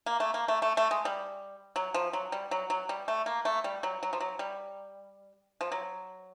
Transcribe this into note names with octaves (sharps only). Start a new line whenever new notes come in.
A#3
A3
A#3
A3
A3
A3
G#3
G3
F#3
F3
F#3
G3
F#3
F#3
G3
A3
A#3
A3
G3
F#3
F#3
F3
F#3
G3
F3
F#3